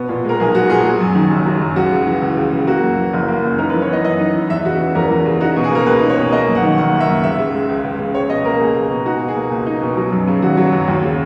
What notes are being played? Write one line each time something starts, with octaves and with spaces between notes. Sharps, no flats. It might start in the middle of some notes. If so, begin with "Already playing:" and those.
Already playing: B2 B3
A#2
G#3 A#4
B1 G#4
B3 F#4
A#2 G#4
F#3 G#4
F#2
D#3
F#1
F#3
F#2
C#2 F#4
C#3
E3
C#2
C#2
C#3
A#3 F#4
F#2
E3
F#1
A#3
F#2
D#4 A#4
B4
E3
C#5
B3 D#5
F#2 D#5
D#4
E3
E2 E5
C#3 F#4
E3
E2 A#4
E2
C#3
D#4 F#4
B2
G#4
A#3 A#4
C#2 B4
D#4
C#5
B2
A#3 D#5
F#2
F#5
D#3
F#1 F#5
A#3
E5
F#2
C#2 E5
C#3
G#3
C#2
C#2
C#3
C#2 C#5
B2 D#5
A#3 A#4
C#2 G#4
C#2
B2
D#4 F#4
B2
G#4
A#3
C#2
D#4
B2
F#3
F#2
C#3
G#1 F#4
F#3
F#2
D#2
C#3